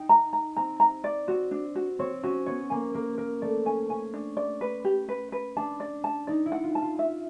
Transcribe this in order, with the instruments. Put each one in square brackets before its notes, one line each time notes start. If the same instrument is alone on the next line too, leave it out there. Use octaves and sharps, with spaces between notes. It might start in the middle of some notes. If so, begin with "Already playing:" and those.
Already playing: [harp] D#4 [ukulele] G5
[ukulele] A#5
A#5
[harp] C4 [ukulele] A#5
[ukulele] A#5
D5
[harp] C4 [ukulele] F#4
[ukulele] D4
F#4
[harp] C4 [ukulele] C#5
[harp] C#4 [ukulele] F#4
[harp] B3 [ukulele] C#5
[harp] A#3 [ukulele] G#5
[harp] A#3 [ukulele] A#4
[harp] A#3 [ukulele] A#4
[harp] A3 [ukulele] D5
[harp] C#4 [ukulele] G#5
[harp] C#4 [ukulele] G#5
[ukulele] D4
D5
B4
G4
B4
B4
[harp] D4 [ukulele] A5
[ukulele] D5
A5
[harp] D#4 [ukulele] D5
[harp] E4
[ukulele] F#5
[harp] F4
[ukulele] A5
[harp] F4
[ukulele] E5